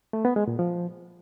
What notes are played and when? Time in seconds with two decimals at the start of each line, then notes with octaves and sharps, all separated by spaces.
0.13 A3
0.25 B3
0.36 G#3
0.48 A#2
0.59 F3